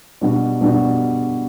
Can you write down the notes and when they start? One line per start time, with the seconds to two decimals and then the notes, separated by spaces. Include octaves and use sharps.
0.21 B2 G3 D4 F#4
0.61 B2 G3 D4 F#4